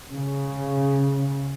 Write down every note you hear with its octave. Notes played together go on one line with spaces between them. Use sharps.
C#3